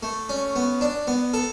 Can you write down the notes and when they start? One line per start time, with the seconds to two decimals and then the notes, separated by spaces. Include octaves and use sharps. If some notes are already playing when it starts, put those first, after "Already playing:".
0.03 A3
0.29 C#4
0.56 B3
0.81 D4
1.07 B3
1.34 A4